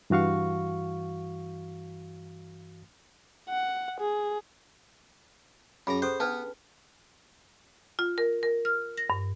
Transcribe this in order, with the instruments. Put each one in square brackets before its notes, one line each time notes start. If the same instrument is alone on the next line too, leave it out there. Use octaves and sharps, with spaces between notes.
[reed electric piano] G2 E3 F#4 F5 C#6
[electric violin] F#5
G#4
[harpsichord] F#2 A#5 [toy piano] G#4 B5
[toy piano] C#4 G4 A4 [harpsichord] C5
[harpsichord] B3 [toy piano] D4 B4 A5
[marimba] F4
A#4
A#4
F6
A#6
G2